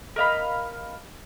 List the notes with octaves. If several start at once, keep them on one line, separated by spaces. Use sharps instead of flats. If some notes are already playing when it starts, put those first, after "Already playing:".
A#4 D#5 F5 B5